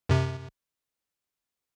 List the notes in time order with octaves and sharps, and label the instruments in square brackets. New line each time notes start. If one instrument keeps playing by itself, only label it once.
[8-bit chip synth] F#2 C3